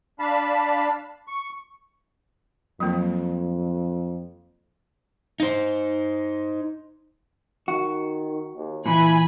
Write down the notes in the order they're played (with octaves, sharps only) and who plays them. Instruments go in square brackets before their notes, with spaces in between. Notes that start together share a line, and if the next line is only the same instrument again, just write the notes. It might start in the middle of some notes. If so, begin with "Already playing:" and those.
[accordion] D4 F5 A5 B5
C#6
[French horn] F2 [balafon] F#3 A#3
[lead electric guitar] D#4 C5
[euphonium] D#3 [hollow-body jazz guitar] F#4
[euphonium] D#2
[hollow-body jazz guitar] A#2 E3 [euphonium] E4 [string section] G#5 B5